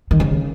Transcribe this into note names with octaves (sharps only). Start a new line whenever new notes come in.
D#3
C#3